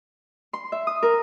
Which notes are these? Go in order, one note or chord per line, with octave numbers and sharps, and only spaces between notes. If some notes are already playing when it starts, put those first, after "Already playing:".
C6
E5
D#6
A#4